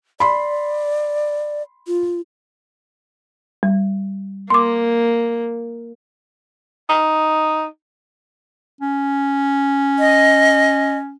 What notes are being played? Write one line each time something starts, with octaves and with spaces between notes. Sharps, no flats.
D5 B5 C6
F4
G3
A#3 C6 D6
D#4
C#4
D#5